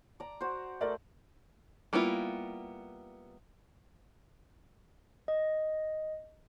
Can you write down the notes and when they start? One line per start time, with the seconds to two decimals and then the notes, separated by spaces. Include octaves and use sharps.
0.20 D5 A#5
0.41 F#4 C5
0.81 A3 A#4 C5 D5 E5
1.93 G3 A#3 B3 E4 F4
5.28 D#5